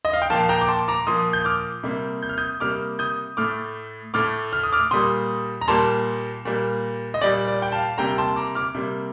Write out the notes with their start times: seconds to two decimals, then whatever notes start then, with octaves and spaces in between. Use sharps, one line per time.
0.05 D#5
0.13 F5
0.22 G5
0.30 A#2 F3 A#3 F5 A5
0.49 G5 A#5
0.61 D6
0.68 A5 C6
0.88 A#5 D6
1.07 A#2 F3 A#3 C6 D#6
1.33 G6
1.45 D6 F6
1.83 C3 G3 A#3
2.22 G6
2.29 F6
2.38 D#6 G6
2.60 C3 G3 A#3 D6 F6
2.99 D#6 G6
3.37 A2 A3 D6 F6
4.14 A2 A3 D6 F6
4.53 F6
4.63 D#6
4.73 D6 F6
4.91 A#2 G3 A#3 C6 D#6
5.61 A#5
5.68 A#2 G3 A#3 A5 C6
6.45 A#2 G3 A#3
7.14 D#5
7.21 A#2 G3 A#3 D5
7.48 D5
7.62 G5
7.72 F5 A5
7.98 C3 G3 A#3 G5 A#5
8.18 A5 C6
8.36 A#5 D6
8.55 D6 F6
8.75 C3 G3 A#3